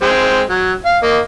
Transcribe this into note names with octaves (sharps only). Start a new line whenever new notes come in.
G#3 C4 G5
F#3
F5
A#3 D#5